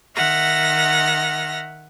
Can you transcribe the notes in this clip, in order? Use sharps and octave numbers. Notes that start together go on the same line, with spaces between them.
D#3 E5 F#5 F6 A#6